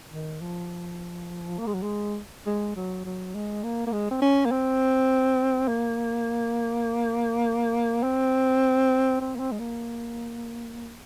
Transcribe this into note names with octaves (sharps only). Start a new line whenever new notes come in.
D#3
F3
A#3
G#3
F#3
G#3
G#3
F#3
F#3
G#3
A#3
A#3
G#3
C4
C#4
A#3
C4
A#3
C4
C4
A#3
C4
G#3
A#3